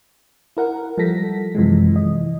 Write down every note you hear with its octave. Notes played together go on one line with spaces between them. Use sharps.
E4 A#4 F#5
F3 G3 A4 A#6 B6
F#2 C3 E3 F3 G#3
E3 D#5